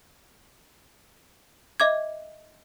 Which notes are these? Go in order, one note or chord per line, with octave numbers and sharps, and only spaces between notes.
D#5 E5 D6 G#6